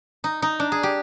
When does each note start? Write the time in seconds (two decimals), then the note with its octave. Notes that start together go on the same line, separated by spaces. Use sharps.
0.24 D#4
0.42 D#4
0.60 D4
0.72 G#4
0.83 G4